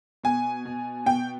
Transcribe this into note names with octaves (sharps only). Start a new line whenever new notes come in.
B2 G#5
B2
B2 G5